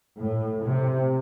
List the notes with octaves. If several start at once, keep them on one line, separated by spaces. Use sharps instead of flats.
A2
C3